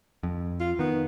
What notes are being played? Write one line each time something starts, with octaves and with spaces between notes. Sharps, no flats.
F2
F4
D#3 B3